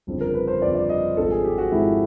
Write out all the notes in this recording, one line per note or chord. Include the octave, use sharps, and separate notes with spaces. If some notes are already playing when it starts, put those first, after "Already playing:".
G1 F2 C#3 F3
A#4
B4
C5
G1 F2 C#3 F3 D5
D5
D#5
G#1 G#2 F3 A4
G#4
G4
F#4
G#1 G#2 F3 E4